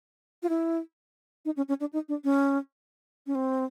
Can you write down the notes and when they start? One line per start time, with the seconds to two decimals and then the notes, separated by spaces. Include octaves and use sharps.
0.43 F4
0.49 E4
1.45 D#4
1.57 C#4
1.68 C#4
1.80 D4
1.93 D#4
2.09 D4
2.24 C#4
3.27 C#4
3.35 C4